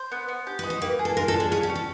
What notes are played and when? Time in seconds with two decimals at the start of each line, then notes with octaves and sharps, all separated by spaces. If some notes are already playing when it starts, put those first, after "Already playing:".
Already playing: C5
0.12 B3
0.28 B3
0.47 G4
0.59 B4
0.64 D#4
0.70 C5
0.82 A#3 B4
0.99 G#4
1.05 A4
1.17 F4 A#4
1.28 A4
1.34 D4
1.40 G#4
1.52 C#4 G#4
1.63 G4
1.70 C#4
1.75 A4